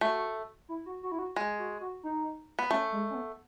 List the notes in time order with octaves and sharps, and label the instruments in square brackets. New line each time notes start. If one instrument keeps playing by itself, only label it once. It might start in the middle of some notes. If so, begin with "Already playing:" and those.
[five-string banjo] A3 [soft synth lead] F#4
[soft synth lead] E4
F#4
F#4
E4
F#4
[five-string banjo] G#3
[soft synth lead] F#4
F#4
D#4
[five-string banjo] B3
[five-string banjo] A3 [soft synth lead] C#4
[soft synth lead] G#3
C#4
B3